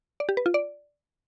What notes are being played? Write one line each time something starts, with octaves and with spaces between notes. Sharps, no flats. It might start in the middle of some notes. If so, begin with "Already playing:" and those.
D5
G4
B4
F4
D5